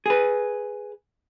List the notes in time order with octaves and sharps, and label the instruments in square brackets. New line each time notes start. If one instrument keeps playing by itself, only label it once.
[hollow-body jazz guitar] G#4 B4